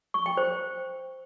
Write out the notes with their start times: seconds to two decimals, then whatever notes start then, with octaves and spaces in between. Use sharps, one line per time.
0.14 C#6
0.26 G5
0.37 C5